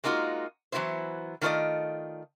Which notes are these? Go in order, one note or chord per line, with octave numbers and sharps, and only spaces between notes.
G#3 A#3 D#4 F4 F#4
E3 F#3 A3 B3 E4 C5
D#3 A3 F4 C5 D5 D#5